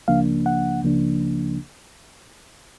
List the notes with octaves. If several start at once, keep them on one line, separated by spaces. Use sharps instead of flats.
C#2 C#3 F3 A#3 D4 F5
F#5
C#2 C#3 F3 A#3 D4